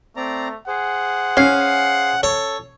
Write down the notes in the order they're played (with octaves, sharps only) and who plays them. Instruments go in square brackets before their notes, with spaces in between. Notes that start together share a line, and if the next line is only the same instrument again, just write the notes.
[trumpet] A3 [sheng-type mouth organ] C4 D5 A#5
[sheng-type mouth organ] G#4 C5 [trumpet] F#5
[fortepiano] C#4 [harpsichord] F5
[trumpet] A4 [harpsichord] C#5